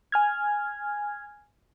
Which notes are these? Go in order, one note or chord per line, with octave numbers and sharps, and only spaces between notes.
G#5 F6 G#6